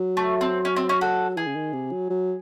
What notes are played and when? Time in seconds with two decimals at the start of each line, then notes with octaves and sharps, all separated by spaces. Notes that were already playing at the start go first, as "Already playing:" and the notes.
Already playing: F#3
0.17 A3
0.41 C4
0.65 C#4
0.76 C4
0.89 C#4
1.01 F#4 A4
1.37 E3 G#4
1.47 C#3
1.55 D#3
1.73 C3
1.92 F#3
2.10 F#3